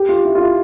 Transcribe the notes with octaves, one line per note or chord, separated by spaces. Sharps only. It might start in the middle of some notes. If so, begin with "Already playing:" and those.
Already playing: G4
F4
E4
F4
E4